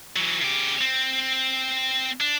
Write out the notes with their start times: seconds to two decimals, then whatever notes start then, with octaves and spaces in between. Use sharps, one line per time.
0.16 E3 F#3
0.42 C#3 G4
0.81 C4
2.21 D4